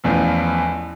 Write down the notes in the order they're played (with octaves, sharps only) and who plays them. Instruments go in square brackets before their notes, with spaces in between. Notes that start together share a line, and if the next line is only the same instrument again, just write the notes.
[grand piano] A1 E2 A2 F3